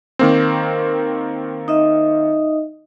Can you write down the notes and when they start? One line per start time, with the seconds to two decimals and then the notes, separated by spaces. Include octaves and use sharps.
0.19 D#3 A#3 C4
1.68 D#4 D#5 E5